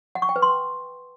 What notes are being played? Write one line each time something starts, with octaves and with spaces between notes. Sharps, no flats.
F#5
C#6
G5
B4
C6